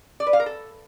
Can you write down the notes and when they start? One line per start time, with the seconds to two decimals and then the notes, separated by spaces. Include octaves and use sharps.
0.20 D5
0.27 B4
0.33 F5
0.40 A#4
0.46 A4